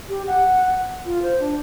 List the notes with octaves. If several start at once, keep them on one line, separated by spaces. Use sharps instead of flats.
G4
F#5
F4
C5
D4